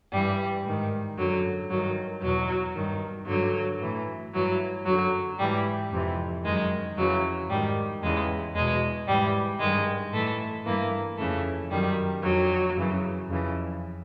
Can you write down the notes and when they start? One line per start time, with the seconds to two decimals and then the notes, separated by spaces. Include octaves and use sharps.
0.13 G2 E3 G3
0.65 G#2 D#3
1.17 F#2 D3 F#3
1.70 G2 D#3 F#3
2.22 E2 B2 F#3
2.75 G2 D#3
3.28 G2 D3 F#3
3.81 A2 E3
4.34 G2 E3 F#3
4.86 F#2 D3 F#3
5.39 G#2 E3 G3
5.92 F2 C3 E3
6.44 F#2 D#3 G#3
6.97 F2 C#3 E3 F#3
7.49 G#2 D#3 G3
8.02 E2 C#3 E3 G#3
8.55 E2 B2 G#3
9.07 G#2 E3 G3
9.60 G2 D#3 G#3
10.12 A2 E3 A3
10.65 G2 E3 A#3
11.18 F2 C#3 E3 A3
11.71 F#2 D#3 G3
12.23 F2 D3 F#3
12.77 F#2 C#3 E3
13.28 F2 C#3 E3